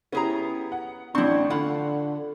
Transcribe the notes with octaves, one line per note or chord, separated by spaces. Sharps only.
B3 C#4 E4 G4 G#4 A#5
F#5
A1 C4 D4 E4 C6 C#6
D3 F4 F#5 B5